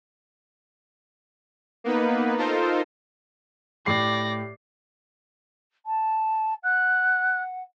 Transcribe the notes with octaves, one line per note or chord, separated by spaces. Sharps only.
A#3 B3 D#4 B4
D#4 F4 A4 A#4 C5
A2 G4 D5 A#6 C7
A5
F#5 F#6